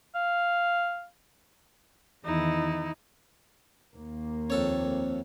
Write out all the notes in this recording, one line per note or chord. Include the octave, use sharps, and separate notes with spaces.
F5
E2 D#3 D#4 E4
D#2 A#3
F2 C4 A4 C#5